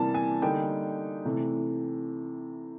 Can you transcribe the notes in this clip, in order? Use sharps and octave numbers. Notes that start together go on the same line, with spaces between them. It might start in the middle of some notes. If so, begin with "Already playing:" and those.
Already playing: C3 E3 G3 A#3 A5
G#5
D3 G3 A#3 D#4 G5
C3 E3 A3